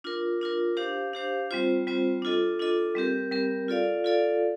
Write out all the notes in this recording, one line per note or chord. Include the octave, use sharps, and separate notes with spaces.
D4 F4 A#4
D4 F4 A#4
D4 G4 C5 F5
D4 G4 C5 F5
G3 C4 F4 C5
G3 C4 F4 C5
D4 F4 A4 D#5
D4 F4 A4 D#5
G3 C4 G4 A#4
G3 C4 G4 A#4
F4 A4 D5 F5
F4 A4 D5 F5